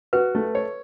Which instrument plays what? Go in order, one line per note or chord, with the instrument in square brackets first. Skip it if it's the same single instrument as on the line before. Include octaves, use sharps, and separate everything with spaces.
[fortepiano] F#4 [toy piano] B4
[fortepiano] A3
C#5